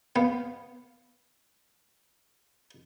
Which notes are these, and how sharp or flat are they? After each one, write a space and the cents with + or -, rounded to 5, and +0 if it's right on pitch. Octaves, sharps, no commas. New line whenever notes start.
B3 +0 F5 +0